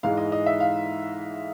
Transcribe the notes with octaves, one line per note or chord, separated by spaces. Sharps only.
G#2 E3 G#3 F5
D#5
D#5
E5
F5